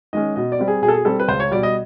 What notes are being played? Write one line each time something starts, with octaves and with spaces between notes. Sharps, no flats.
D#3 G#3 C#4 D#5
B2 D#5
D5
G3 C4
G#4
B2 G#4
A4
G#4
G3 C4 A4
B4
C#2 C5
C#5
B2 G3 D5
D#5